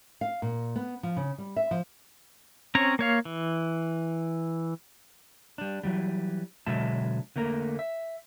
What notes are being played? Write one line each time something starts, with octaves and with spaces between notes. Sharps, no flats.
F5
A#2
B3
F3
C#3
G3
E5
F3
C4 C#4 C#5 A#5
A#3 C#5 F5
E3
G3 D4
E3 F#3 G3
B2 D3 F#3 G#3 E5 A5
D3 A3 A#3 A#4
E5